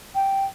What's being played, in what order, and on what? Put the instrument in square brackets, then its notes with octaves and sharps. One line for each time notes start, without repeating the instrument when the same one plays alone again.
[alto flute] G5